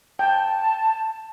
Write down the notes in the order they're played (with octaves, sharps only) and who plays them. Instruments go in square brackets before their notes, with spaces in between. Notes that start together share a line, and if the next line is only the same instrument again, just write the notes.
[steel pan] G5 [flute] A5